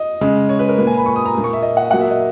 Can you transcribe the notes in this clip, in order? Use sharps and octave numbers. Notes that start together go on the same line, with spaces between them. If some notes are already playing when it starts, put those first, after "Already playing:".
Already playing: D#5
C#3 G#3
C#5
B4
A#4
A#2 A#3 B4 G#5
B5
C#6
D#6
A#5
A#2 A#3
C#6
E5
D#5
F#5
A#2 F#3 A#3 F#5
E5
D#5